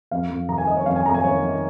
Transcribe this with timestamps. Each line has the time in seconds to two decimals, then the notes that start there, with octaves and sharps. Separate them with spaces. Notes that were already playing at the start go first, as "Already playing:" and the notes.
0.11 F2 F5
0.30 F2
0.49 D#3 A#5
0.58 G#5
0.67 D#3 D#5
0.77 C#5
0.86 F2 F5
0.96 G#5
1.06 F2 A#5
1.14 G#5
1.24 D#3 C#5
1.43 D#3